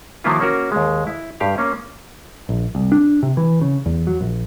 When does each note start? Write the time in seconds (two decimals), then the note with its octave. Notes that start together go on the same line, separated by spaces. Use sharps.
0.24 D#3 F3 F#3 A#3 E4 F4
0.40 A#3 C#4 F#4 A#4
0.72 D#2 G#3
1.07 E4
1.40 G2 G4 F5
1.58 A#3 C#4
2.49 A#1
2.75 C2
2.92 D4
3.23 C3
3.37 E3
3.61 C#3
3.86 E2
4.07 F#3
4.21 A#1